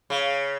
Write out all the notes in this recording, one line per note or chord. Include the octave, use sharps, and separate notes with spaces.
C#3